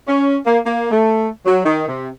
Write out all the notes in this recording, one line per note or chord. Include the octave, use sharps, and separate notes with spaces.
C#4
A#3
A#3
A3
F#3
D#3
C3